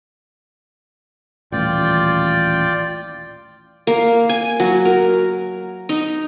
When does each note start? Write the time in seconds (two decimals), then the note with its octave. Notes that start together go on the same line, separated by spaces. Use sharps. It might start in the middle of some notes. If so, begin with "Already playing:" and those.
1.52 D#1 A1 F4 D5 G5
3.87 A#3
4.29 G#5
4.60 F#3
4.85 A#4
5.89 D#4